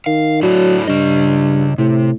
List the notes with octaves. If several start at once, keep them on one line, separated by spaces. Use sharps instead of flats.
D#3 F5
F#3 A3 D4 E4
G2 C#3 D#5
A2 C3